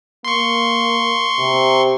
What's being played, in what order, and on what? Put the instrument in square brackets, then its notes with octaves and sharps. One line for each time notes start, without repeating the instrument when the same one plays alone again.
[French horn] A#3 [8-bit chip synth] C6 C#6
[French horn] C3